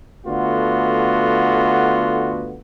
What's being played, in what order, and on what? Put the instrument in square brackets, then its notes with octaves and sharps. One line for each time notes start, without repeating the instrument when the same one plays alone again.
[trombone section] D3 A3 B3 F4 F#4